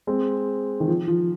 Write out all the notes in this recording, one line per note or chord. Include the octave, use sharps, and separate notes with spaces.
G#3 C4
D#3
F3
F3